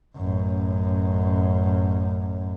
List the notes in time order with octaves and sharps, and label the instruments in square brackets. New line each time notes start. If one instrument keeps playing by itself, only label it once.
[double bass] A1 F#2